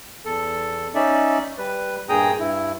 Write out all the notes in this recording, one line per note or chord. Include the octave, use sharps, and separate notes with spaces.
E2 A4
C#4 D#4 D5 E5
G3 B4
G2 A#2 G#4 G5 A#5 D#6
G2 E4